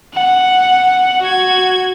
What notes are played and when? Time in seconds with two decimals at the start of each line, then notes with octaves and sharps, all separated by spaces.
0.14 F#5
1.22 F#4 G#6